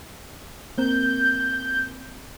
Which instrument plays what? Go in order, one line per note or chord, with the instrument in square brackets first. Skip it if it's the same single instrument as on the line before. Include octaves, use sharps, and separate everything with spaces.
[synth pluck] A#3 C4 A#4 [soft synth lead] G6